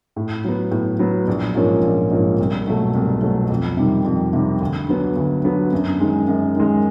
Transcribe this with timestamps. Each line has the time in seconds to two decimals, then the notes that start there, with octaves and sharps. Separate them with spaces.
0.16 A2
0.45 F#3 B3
0.71 A2
0.99 F#3 B3
1.27 A#1
1.55 G#2 F3 A#3 C#4
1.82 A#1
2.11 G#2 F3 A#3 C#4
2.39 C2
2.67 B2 F#3 A3
2.94 C2
3.22 B2 F#3 A3
3.50 F2
3.77 C3 D#3 G3
4.05 F2
4.33 C3 D#3 G3
4.61 D2
4.88 D3 F#3 B3
5.17 D2
5.45 D3 F#3 B3
5.73 F#2
6.00 D#3 G#3
6.28 F#2
6.55 D#3 G#3